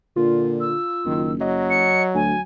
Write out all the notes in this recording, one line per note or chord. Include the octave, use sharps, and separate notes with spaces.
A#2 D3 F4
E6
F#1 D#3
F#3 D#5
C#7
D2 G#5